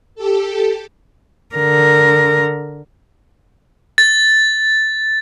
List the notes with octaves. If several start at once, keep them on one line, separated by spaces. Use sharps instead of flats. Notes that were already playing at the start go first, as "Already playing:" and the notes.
G4 A4
D3 A#4
A6